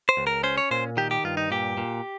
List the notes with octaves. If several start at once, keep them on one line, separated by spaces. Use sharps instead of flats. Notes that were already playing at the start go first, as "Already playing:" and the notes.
C5
C#2
A#4
C#4 C5
C#5
A#2 C5
D#3 G4
G4
G2 F4
D#4
A#2 G4
A#2